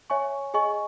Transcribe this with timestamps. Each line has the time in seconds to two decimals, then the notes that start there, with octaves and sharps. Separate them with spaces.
0.10 C#5 E5 G#5 C#6
0.54 G#4 D#5 G#5 C#6